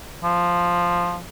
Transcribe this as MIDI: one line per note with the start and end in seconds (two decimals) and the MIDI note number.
0.23 1.20 53